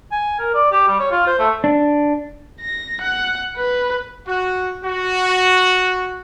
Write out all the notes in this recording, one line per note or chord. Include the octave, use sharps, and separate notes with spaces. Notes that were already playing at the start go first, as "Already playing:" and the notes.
G#5
A#4
D5
G4
G3
C#5
F4
C5
A3
D4
A#6
F#5
B4
F#4
F#4